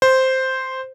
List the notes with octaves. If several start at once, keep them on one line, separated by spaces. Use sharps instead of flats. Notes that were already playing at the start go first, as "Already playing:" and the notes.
C5